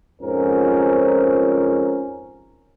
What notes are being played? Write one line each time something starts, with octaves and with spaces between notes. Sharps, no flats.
F2 G#2 C#4 F4 A#4 C5